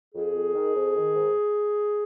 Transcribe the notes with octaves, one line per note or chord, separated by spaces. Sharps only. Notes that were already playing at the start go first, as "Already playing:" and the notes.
F2 G#4
F2
D#3
F2
D#3
G#2